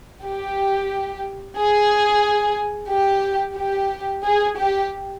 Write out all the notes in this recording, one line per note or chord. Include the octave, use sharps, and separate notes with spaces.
G4
G#4
G4
G4
G#4
G4